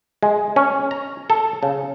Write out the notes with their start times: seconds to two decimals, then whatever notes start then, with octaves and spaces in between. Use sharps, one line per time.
0.23 G#3
0.56 C#4
0.91 A#5
1.30 A4
1.63 C#3